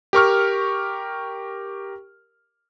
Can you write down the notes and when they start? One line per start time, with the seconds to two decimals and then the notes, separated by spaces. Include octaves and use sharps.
0.13 G4 A#4 C#6 F6